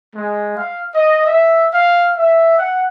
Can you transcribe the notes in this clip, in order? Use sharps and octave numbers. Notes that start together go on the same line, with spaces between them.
G#3
F5
D#5
E5
F5
E5
F#5